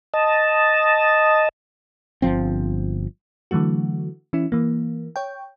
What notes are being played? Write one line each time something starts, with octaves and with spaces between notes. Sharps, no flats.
D#5 A5
G1 F3 C4
D3 E3 F#3 A3 F#4
E3 C#4 E4
E3 A#3
C#5 G5